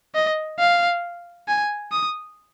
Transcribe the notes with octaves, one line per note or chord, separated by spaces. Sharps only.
D#5
F5
G#5
D#6